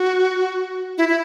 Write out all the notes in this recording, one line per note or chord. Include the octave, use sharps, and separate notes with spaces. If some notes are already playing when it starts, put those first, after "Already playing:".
Already playing: F#4
E4
E4